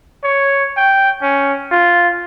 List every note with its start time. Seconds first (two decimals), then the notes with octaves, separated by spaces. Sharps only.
0.24 C#5
0.77 G5
1.22 C#4
1.71 F4